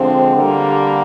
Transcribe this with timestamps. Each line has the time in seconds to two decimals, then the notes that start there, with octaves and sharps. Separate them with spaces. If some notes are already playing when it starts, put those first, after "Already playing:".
Already playing: D3 F3 G#3 C4
0.34 D3 G3 A#3